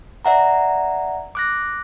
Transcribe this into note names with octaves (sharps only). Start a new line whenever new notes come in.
D5 E5 F#5 A#5
D6 F#6 A#6